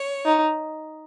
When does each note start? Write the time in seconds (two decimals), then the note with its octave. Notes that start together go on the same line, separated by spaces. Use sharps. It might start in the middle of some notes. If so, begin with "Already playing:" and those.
Already playing: C#5
0.25 D#4